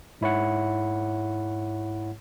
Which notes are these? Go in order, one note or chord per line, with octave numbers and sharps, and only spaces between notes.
G#2 E4 C#5 F#5